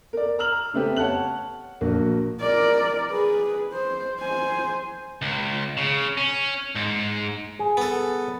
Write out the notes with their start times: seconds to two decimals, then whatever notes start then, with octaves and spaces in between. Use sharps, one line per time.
0.13 A#4 D5
0.39 A#5 E6 F6 F#7
0.74 C#3 A3 B3 C4 G4 A4
0.96 C#5 F#5 A5 F#6 F#7
1.81 A#1 A#3 F#4
2.41 A#4 D5
3.11 G#4 B4
3.73 C5
4.21 C5 G#5
5.22 C#2
5.77 C#3
6.17 C#4
6.75 G#2
7.59 G#4
7.77 B3 A4